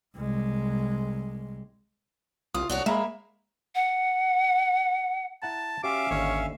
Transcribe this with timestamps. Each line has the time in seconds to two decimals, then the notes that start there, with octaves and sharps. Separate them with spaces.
0.16 C2 G#3
2.54 C2 F4 D#6
2.69 C2 D4 F#4 C#5
2.86 G#3 A#3 E5 A#5 B5
3.75 F#5
5.42 E4 F#5 A5 A#5
5.83 C#4 F#4 G4 C#5 E5 F5 D6
6.11 G#1 D#2 D3 C#5